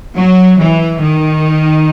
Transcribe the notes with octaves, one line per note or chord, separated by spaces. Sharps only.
F#3
E3
D#3